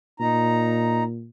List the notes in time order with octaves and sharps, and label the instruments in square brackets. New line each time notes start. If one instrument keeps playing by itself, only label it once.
[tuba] A#2 [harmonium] D#4 A#5